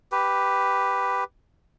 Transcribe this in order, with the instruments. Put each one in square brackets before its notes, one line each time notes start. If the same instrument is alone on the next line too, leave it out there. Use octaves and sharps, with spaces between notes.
[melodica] G4 B4